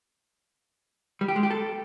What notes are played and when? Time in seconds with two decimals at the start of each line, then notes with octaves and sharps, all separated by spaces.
1.21 G3
1.28 G4
1.36 G#3
1.43 G4
1.50 A4